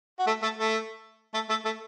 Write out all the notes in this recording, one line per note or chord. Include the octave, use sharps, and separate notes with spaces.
F#4
A3 A4
A3 A4
A3 A4
A3 A4
A3 A4
A3 A4